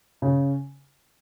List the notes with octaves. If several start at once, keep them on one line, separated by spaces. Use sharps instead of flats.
C#3